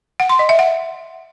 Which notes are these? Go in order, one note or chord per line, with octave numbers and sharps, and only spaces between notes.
F#5
C6
D#5
E5
F#5